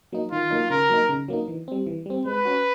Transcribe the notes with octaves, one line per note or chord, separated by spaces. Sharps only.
F#3 A#3 D#4
D#3 F4
F#3 A#3 D#4
C#3 A#4
F#3 A#3 D#4
C#3
F#3 A#3 D#4
E3
G3 C4
E3
G3 C4
G#3 B4
C#4 F#4